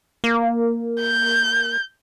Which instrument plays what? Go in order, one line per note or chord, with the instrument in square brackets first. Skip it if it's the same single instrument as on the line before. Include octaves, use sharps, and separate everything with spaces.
[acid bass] A#3
[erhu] G6